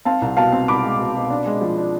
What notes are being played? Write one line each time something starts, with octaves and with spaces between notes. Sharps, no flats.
C4 F5 A5
C2
B2 F5 A5
C4
C2 B5 D6
G#3
B2
B2
D4
G#3
F3
D4